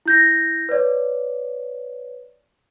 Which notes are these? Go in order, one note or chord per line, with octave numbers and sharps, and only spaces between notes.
E4 G6 A#6
B4 C#5 D5